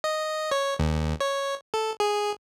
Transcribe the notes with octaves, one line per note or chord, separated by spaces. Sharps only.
D#5
C#5
D#2
C#5
A4
G#4